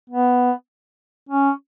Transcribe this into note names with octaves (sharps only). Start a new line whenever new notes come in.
B3
C#4